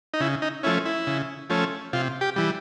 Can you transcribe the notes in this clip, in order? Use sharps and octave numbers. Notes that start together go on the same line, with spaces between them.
D#4
C#3 E4
D#4
F3 A3 C#4 E4
E4
C#3
F3 A3 C#4
C3 F4
G4
E3 G3